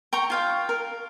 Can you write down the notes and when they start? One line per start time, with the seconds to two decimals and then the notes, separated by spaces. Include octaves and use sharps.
0.13 G5 A#5 C#6
0.30 F4 F5 G5
0.69 A#4